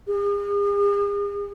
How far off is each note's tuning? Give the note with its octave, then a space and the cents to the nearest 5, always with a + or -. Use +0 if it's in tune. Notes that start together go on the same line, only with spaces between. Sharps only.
G#4 -45